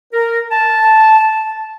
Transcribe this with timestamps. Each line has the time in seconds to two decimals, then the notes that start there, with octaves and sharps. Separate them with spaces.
0.12 A#4
0.51 A5